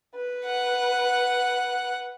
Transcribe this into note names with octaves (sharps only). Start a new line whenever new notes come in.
B4
F#5